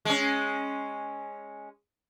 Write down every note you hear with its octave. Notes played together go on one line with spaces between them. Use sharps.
G#3 C#4